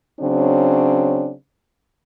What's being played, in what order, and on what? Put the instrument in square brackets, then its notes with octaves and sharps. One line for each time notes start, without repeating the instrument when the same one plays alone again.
[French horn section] C#3 F#3 C4 D4